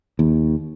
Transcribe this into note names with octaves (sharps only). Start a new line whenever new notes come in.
D#2